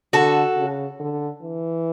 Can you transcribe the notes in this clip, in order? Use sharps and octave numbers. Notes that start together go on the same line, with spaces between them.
D3 F#4 A4
C#3
D3
E3